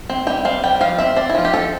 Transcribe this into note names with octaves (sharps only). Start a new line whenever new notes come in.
C4
G3 G5
C4 F5
G3 G5
F3 F5
C4 E5
C4 D5
E4
F3 F4
G4
F3 A4